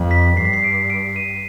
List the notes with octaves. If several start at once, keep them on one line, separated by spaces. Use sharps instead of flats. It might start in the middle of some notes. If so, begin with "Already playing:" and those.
Already playing: F2
B6
G2 C7
B6
C7
D7
D7
D#7